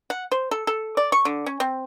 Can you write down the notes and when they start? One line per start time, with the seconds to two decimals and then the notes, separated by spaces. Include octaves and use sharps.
0.10 F#5
0.32 C5
0.51 A4
0.67 A4
0.97 D5
1.12 C#6
1.25 D3
1.46 C#4
1.60 C4